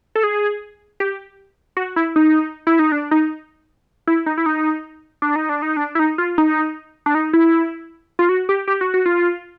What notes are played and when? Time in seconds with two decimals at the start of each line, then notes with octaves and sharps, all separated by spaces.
0.15 A4
0.24 G#4
1.00 G4
1.77 F#4
1.96 E4
2.16 D#4
2.67 E4
2.79 D#4
2.92 D4
3.11 D#4
4.07 E4
4.26 D#4
4.38 E4
4.46 D#4
5.22 D4
5.36 D#4
5.49 D4
5.62 D#4
5.77 D4
5.95 E4
5.99 D#4
6.18 F4
6.38 D#4
7.06 D4
7.15 D#4
7.33 E4
8.19 F4
8.29 F#4
8.49 G4
8.67 G4
8.81 F#4
8.94 F#4
9.06 F4